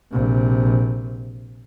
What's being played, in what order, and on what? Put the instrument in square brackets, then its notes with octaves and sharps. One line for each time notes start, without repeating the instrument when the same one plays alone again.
[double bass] A#1 C3